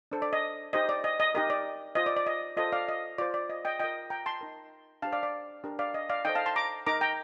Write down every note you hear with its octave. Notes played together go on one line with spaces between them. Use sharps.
D4 A4 C5
D5
D#5
D#4 G4 C5 D#5
D5
D#5
D#5
D#4 G4 A#4 D#5
D5
F4 C5 D#5
D5
D5
D#5
F4 A4 C5 D#5
D5 F5
D#5
F4 C5 D5
D5
D#5
D#5 G5
F4 A#4 D#5 G5
G5 A#5
A5 C6
D#4 A#4
D4 G4 C5 F5 A5
D5 F5
D5
D4 G4 A#4
D5 F5
D#5
D5 F5
D#4 A4 C5 D#5 G5
F5 A5
A5 C6
A#5 D6
D#4 A#4 A#5 D6
G5 A#5